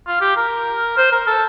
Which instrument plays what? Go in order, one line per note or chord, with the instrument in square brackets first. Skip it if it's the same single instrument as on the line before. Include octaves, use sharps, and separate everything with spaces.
[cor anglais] F4
G4
A#4
C5
A#4
A4